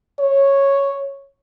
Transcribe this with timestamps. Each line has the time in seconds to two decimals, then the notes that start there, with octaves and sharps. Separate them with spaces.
0.20 C#5